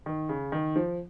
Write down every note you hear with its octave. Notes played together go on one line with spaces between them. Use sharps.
D#3
C#3
D#3
F3